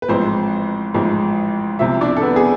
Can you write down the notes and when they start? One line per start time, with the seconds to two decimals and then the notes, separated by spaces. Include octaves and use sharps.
0.02 B4
0.08 A1 G#2 F3 C4 C5
0.94 A1 G#2 F3
1.79 C2 C3 F3 E4 E5
2.01 D4 D5
2.17 A4
2.22 B3 B4
2.36 G#4